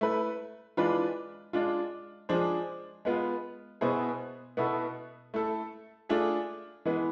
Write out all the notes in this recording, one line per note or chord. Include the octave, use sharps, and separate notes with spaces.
A3 E4 B4
E3 G#3 D4 F4 B4
G#3 D4 F4
F3 G#3 D4 G#4 C5
G#3 B3 F4
B2 B3 E4 G#4 C5
B2 B3 E4 A4
A3 E4 A4
A3 D4 F4 G#4
E3 G#3 B3